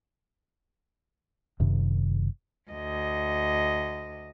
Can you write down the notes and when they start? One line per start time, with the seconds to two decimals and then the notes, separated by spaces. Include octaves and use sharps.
1.60 F#1 F#2 C3 D#3
2.71 D2 D#5